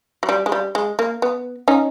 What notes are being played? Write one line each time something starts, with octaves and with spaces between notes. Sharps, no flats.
F#3
G3
G#3
G3
G#3
A#3
B3
C#4 D#4